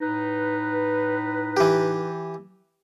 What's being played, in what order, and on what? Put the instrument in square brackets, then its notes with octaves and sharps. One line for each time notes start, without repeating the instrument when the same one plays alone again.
[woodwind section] A2 D#4 B4
[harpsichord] E3 G4